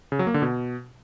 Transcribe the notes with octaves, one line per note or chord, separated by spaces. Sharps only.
C#3
F#3
A#3
D3
B2